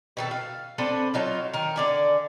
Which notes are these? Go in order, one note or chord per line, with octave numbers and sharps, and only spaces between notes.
B2 D#3 A4
F5
C4 D4 A4 B4
F#3 D#4 F4
D#3 A#4
D3 D5 G#5